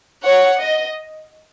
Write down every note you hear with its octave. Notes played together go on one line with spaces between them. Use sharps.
C#5 F#5
D#5